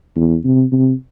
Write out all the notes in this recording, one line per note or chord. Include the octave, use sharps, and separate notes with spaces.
E2
C3
C3